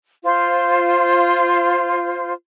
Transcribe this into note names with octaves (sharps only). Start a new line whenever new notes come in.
F4 C5